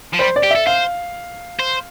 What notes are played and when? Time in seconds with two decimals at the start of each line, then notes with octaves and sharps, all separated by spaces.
0.14 F3
0.19 G3 C5
0.36 D5
0.43 G4
0.51 A4 E5
0.67 C5 F5
1.59 C5